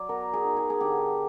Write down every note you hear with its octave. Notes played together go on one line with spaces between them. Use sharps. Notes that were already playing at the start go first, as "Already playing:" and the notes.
Already playing: F#3 D5
B3 A#4
G#4
D#4
G#4
G#4
D3 G4